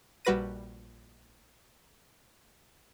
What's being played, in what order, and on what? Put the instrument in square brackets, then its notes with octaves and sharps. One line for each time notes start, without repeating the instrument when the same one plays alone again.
[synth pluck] A#1 G3 F#4 B4 A#6 D#7